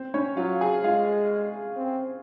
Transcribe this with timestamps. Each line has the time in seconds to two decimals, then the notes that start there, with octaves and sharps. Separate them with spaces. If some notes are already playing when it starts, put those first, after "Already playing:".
Already playing: C4 C5
0.14 C#4 C#5
0.37 F#3 F4 F5
0.61 G#4 G#5
0.84 G#3 F4 F5
1.77 C4